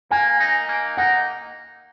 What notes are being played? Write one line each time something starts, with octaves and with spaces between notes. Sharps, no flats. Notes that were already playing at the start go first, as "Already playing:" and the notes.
A#3 G#5
D#4
A#3
D#4 F#5